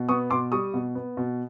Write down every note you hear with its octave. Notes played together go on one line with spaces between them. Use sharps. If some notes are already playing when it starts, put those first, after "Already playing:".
Already playing: B2
B3 C#6 D#6
B2 C6 D6
G3 C#6 D#6
B2
B3
B2